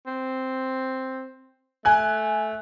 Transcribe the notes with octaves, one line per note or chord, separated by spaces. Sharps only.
C4
A3 G#5 F#6